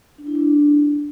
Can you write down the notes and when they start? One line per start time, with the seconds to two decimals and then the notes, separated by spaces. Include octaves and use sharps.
0.18 D4
0.27 E4
0.35 D4